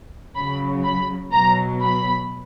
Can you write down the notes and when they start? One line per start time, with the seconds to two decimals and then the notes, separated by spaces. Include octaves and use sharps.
0.36 C#3 F#3 B5
0.84 B5
1.32 B2 F#3 A#5
1.81 B5